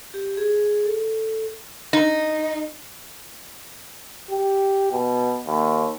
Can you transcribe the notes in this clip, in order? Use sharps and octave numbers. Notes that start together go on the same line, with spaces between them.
G4
G#4
A4
D#4
G4
B2
D#2